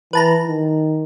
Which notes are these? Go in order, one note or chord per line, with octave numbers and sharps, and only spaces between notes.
E3 B4 A5 A#5
D#3